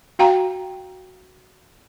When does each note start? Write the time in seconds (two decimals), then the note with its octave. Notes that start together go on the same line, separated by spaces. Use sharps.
0.19 F#4 F5 G5 A#5